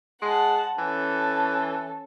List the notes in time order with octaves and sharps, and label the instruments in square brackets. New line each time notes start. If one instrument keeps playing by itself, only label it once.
[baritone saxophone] G#3 [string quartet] F#5 A5
[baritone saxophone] E3 [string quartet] C#4 A4